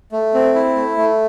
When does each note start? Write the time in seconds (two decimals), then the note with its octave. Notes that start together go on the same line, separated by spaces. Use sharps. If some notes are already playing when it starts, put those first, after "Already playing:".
0.12 A3
0.34 C4
0.55 E4
0.76 A3
0.97 A3